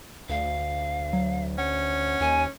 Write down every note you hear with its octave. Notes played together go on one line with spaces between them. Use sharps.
D2 F5
F#3
C#4 F#5
D#2 G#5